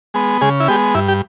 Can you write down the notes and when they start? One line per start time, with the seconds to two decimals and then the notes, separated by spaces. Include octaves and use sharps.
0.14 G#3 B3
0.41 C#3 G#3 G#4
0.60 E4
0.68 G#3 B3 G4
0.95 G2 E4
1.08 G4